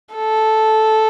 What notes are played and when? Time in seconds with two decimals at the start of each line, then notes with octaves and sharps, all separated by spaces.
0.15 A4